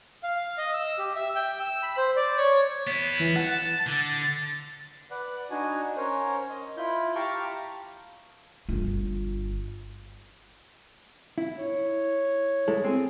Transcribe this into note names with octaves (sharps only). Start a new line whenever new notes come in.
F5
D#5
E6
G4
E5
G5
E6
B5
C5
D5
C#5
B3 E4
E3
F#5 A5
A6
D3
B4 D5 F#5
D4 D#4 F#4 G#5
C#4 A#4 C5 C#5
D#5
E4 F4 B5 G6
G4 F5 A5 A#5 C#6 D6
G1 F4
E4
C#5
G#3 E4 A4
C4 G#4